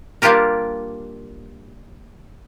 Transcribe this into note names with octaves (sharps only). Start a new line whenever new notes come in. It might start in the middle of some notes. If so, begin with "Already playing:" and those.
G3 A#3 D4 F4 G4 A#4